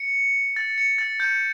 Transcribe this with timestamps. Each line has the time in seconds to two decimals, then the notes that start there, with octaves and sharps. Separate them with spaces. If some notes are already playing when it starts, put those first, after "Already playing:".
Already playing: C#7
0.56 A6
0.78 C#7
0.98 A6
1.20 G6